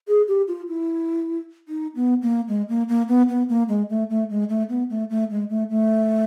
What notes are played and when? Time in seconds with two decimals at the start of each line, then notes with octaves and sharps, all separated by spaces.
0.08 G#4
0.28 G4
0.48 F4
0.68 E4
1.68 D#4
1.96 B3
2.22 A#3
2.48 G#3
2.69 A#3
2.89 A#3
3.08 B3
3.29 B3
3.49 A#3
3.69 G#3
3.90 A3
4.10 A3
4.30 G#3
4.49 A3
4.69 B3
4.90 A3
5.10 A3
5.30 G#3
5.49 A3
5.70 A3